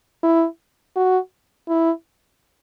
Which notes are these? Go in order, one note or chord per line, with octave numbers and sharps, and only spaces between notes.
E4
F#4
E4